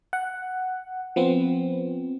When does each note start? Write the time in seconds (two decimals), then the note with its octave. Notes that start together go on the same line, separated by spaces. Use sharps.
0.13 F#5
1.16 F3 B3 C4